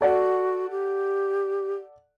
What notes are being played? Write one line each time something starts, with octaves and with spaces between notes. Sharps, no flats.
F#4 A4 D5 F#5
G4